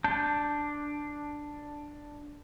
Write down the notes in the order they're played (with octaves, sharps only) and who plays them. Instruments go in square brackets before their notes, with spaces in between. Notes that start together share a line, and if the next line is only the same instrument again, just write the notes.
[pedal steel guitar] D4 A5 G6